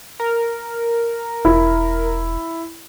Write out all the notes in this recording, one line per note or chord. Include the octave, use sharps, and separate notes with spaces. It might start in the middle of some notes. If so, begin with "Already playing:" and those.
A#4
E1 E4